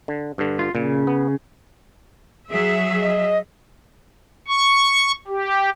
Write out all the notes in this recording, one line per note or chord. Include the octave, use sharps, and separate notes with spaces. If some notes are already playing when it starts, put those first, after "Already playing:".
D3
G2 D3
F4
A#2 C#3
B3
F#3 G#4 E5
D#5
C#6
G4